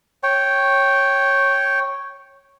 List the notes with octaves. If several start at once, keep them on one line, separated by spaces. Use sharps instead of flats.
C#5 G5